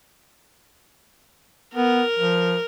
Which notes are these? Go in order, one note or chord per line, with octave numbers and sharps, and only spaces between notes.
B3 A#4
F3